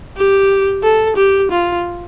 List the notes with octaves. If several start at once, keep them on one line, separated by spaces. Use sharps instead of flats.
G4
A4
G4
F4